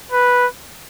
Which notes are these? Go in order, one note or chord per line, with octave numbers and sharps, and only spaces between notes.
B4